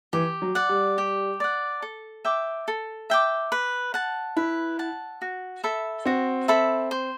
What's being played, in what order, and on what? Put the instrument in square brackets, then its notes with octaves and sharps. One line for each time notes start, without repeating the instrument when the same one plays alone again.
[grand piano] E3 [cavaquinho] G4
[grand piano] F#3
[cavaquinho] D5 F#5
[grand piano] G3
[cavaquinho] G4
D5 F#5
A4
E5 G5 D6
A4
E5 G5 D6
B4
F#5 A5
[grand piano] E4 [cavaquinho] B4
[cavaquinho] F#5 A5
F#4
A4 E5 B5
[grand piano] C4 [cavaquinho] F#4
[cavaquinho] A4 E5 B5
C5